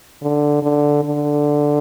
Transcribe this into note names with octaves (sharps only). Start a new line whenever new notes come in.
D3
D3
D3